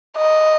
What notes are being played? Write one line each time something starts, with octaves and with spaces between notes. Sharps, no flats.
D#5